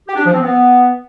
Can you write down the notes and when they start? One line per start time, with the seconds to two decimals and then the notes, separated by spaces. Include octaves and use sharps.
0.07 G4
0.16 D4
0.24 F3
0.33 C4
0.41 B3